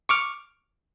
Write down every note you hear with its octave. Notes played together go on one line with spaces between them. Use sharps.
C#6 D6 F6